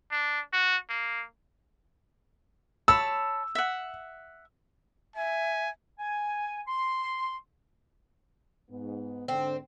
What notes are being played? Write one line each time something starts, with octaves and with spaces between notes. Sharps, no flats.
D4
F#4
A#3
C#5 A5 B5 E6
E5 F#5
E5 G#5
G#5
C6
G#2 B3
G#2 D3 C4